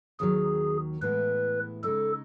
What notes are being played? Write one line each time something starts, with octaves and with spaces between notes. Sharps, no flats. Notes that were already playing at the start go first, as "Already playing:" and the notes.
D#2 D#3 F#3 G#4
A2 E3 G#3 B3 E4 B4
C#3 G#3 D#4 A4